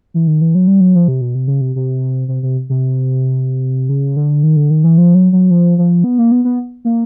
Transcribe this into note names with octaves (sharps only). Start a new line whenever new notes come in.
E3
D#3
E3
F#3
G3
F#3
F3
C3
B2
C3
C#3
C3
C3
C3
C3
C3
C#3
D3
D#3
D3
D#3
E3
F3
F#3
F#3
F3
F3
B3
A#3
B3
B3
A#3